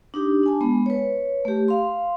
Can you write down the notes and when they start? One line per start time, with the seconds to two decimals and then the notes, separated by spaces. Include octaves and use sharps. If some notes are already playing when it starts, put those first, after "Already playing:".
0.14 D4 D#4 G4
0.43 D4 G#5 A5
0.61 G#3 B3
0.86 B4 C#5
1.45 A3 G4
1.68 F5 C6